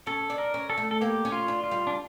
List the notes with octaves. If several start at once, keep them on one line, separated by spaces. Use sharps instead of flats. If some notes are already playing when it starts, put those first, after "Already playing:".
C#4 A4
D4
A#4
C#4
A4
A3
A4
A#3 G4
C#4
F4
D4
F4
G3
D4